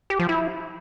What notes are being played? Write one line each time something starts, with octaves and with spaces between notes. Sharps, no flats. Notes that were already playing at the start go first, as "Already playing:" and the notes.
G4
F3
E4